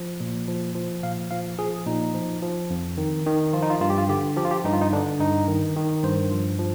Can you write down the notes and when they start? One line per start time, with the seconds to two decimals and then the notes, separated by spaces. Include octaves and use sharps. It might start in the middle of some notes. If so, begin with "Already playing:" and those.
Already playing: F3
0.20 A#2
0.48 F3
0.75 F3
1.03 A#2 F5
1.31 F3 F5
1.58 F3 G#4
1.86 A#2 D#4
2.14 F3
2.43 F3
2.70 F2
2.97 D#3
3.26 D#3
3.53 F3 F4
3.62 D#4
3.70 F4
3.81 G2 F4
3.90 G4
3.98 F4
4.09 D3 G4
4.37 F3 G4
4.45 F4
4.51 G4
4.64 G2 D#4
4.73 F4
4.82 D#4
4.93 D3 D4
5.20 G2 D#4
5.48 D#3
5.76 D#3
6.03 G2 C5
6.32 F3
6.59 F3